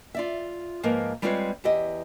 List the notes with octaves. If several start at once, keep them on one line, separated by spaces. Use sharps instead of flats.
F4 D5 E5
G#2 F3 A#3 A#4 B4 D#5
G3 G#3 C4 F4 B4 C#5
E2 E4 G4 D#5